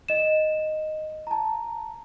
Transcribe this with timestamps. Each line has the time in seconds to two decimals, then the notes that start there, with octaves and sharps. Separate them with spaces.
0.08 D#5 E7
1.27 A5 A#5